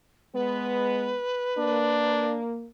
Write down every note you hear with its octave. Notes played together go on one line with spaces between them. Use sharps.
G#3 B3 B4
A#3 D4